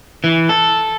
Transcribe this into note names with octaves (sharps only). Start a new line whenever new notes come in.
E3
A4